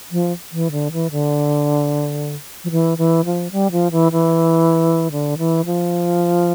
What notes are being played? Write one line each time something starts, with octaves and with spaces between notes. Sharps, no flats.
F3
E3
D3
E3
D3
F3
E3
E3
F3
G3
F3
E3
E3
D3
E3
F3